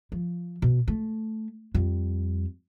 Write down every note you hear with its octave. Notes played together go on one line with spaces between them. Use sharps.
F3
B2
A3
F2 G3